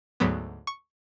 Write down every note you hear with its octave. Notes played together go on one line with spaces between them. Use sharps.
D2 G#2 F#3 B3
C#6